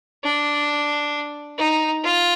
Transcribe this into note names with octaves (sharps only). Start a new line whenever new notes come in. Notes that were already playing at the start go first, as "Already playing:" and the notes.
D4
D#4
F4